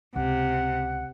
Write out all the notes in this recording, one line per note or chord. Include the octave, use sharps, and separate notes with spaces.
C#2 C3 F#5